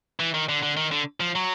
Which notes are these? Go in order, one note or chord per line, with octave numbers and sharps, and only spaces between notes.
E3
D#3
D3
D3
D#3
D3
F3
F#3